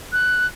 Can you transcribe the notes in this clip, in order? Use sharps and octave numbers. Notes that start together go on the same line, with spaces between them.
F#6